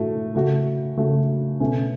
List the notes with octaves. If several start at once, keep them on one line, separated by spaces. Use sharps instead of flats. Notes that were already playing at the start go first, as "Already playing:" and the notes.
Already playing: A2 A3 F#4
C#3 A3 F#4
C#3 A3 F#4
B2 A3 C#4